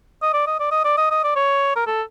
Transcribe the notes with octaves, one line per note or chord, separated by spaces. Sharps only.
D#5
D5
D#5
D5
D#5
D5
D#5
D#5
D5
C#5
A#4
A4